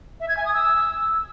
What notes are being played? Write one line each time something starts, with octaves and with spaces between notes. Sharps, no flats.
E5
G#6
G#5
D#6
E6